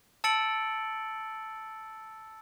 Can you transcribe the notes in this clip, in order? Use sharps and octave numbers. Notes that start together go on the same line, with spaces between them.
A5 E6 A6 C#7 D7 F#7